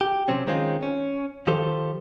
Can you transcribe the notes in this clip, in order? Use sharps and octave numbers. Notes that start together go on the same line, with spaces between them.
G4
C3 F#3 C4 C#4
D#3 G#3 C4 C#4 F4
C#4
D#3 F3 G4 A4 C5